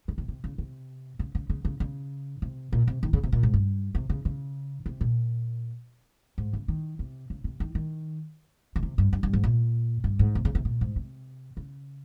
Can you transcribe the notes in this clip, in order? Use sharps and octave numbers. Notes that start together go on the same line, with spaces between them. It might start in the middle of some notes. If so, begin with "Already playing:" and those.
C#3
C3
C3
C#3
C3
C#3
C#3
C#3
C#3
C#3
C3
A#2
C3
D#3
C#3
C3
A#2
G#2
G2
C3
C#3
C#3
C3
A#2
G#2
C#3
D#3
C3
C#3
C3
D#3
D#3
C#3
C3
G2
G2
G2
G#2
A#2
G2
G#2
C3
C#3
C3
A#2
G#2
C3
C#3